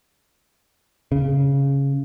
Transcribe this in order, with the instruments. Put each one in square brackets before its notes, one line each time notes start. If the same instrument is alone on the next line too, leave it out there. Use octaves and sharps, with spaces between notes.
[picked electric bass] C#3